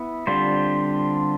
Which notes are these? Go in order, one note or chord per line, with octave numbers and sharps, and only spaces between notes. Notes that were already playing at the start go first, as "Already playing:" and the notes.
Already playing: B3 E4
D3 G3 C4 F4 C5